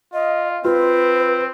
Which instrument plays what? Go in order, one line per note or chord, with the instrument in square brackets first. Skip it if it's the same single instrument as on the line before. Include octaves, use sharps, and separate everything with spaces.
[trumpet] F4 [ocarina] D#5
[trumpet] C4 [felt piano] F4 [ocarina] B4